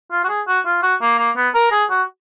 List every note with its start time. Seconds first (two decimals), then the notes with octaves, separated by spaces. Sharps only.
0.12 F4
0.24 F#4
0.29 G#4
0.47 F#4
0.66 F4
0.83 F#4
1.01 A#3
1.18 A#3
1.36 B3
1.55 A#4
1.72 G#4
1.90 F#4